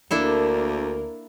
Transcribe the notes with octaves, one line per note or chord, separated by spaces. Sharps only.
D2 A#3 D4 E4 A4 A#4